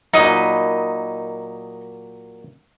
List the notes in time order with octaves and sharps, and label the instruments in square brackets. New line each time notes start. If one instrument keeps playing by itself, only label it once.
[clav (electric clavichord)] A#2 F#3 [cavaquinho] D#4 D#5 B5